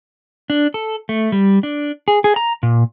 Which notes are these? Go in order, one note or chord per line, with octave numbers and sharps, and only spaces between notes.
D4
A4
A3
G3
D4
G#4
G#4
A#5
A#2